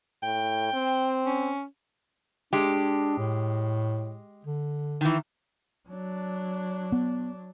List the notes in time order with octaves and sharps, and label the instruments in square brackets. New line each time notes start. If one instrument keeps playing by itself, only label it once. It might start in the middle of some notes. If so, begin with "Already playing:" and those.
[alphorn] A2 [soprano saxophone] G5
[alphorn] C4
[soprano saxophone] C#4
[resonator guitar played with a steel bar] G#3 G4 [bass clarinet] D4
[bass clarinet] A2
D3
[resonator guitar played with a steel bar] D#3 E3
[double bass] F#3 D4
[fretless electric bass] B3